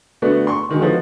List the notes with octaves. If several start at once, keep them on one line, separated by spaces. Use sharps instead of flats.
D3 A3 B3 D4 F#4
C6 C#6
D3 D#3 F#3 G#3
F3 B3 D#4 F#4 A4